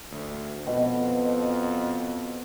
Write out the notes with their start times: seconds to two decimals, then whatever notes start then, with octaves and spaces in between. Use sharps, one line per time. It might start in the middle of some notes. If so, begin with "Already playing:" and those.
0.11 D2
0.67 F2 B2